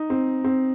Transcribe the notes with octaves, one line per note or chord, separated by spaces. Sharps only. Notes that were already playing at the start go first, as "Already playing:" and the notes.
Already playing: D#4
C4
C4